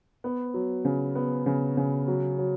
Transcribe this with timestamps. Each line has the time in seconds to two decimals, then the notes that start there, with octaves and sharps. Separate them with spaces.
0.24 B3
0.54 F#3
0.85 C#3
1.15 B3
1.46 C#3
1.77 C#3
2.08 F#3
2.38 F#3